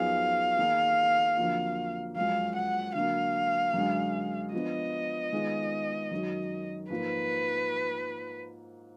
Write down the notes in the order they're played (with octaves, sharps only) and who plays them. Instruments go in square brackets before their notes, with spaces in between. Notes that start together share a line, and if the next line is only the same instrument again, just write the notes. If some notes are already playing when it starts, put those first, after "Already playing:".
Already playing: [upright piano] F#2 F3 B3 D#4 G#4 [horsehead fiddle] F5
[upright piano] D#3 A#3 D#4 G#4
F2 D3 F#3 A#3 F4
[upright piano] F#2 F3 G#3 [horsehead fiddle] F5
[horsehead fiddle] F#5
[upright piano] D3 F#3 A#3 [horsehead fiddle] F5
[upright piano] F#2 D3 G#3
[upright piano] F3 B3 D4 [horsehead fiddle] D#5
[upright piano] D#3 G#3 B3 F4 G#4
F#2 D#3 F#3
[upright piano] G#2 F3 A#3 [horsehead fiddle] B4